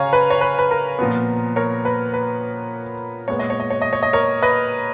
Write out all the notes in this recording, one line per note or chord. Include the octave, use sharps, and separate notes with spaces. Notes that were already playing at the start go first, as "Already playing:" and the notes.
Already playing: C#3 C#5 F5 G#5 A#5
B4
C#5
B4
B4
A#4
A#2 F3 B3
A#4 C#5
B4
B4
A#2 G#3 B3 C#5
D#5
C#5
D#5
C#5
D#5
C#5
D#5
A#4 C#5
B4 D#5